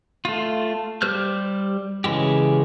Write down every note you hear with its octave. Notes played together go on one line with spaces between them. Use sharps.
A3 F4
G3 G4 C5 F6 G6
C#3 E3 G#3 G4